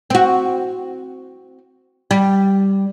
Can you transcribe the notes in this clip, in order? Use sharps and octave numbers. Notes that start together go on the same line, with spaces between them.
C4 F#4
G3